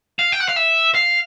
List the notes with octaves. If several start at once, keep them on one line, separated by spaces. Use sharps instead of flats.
F5
G5
F#5
F5
E5
F5